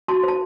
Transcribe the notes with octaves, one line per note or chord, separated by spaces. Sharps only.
F#4 A5 C6
C5 A5